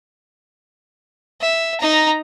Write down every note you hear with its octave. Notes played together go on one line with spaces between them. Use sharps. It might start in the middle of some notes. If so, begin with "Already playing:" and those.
E5
D#4 A#5